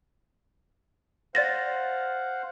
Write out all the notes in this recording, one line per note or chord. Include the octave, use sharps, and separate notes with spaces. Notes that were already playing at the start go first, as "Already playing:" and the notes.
C5 D5 F5 F#5 A6 A#6